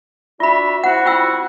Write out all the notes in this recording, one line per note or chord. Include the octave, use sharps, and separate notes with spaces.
D4 F4 F#4 E5 B5
C4 E4 F#4 F#5
F4 G5 E6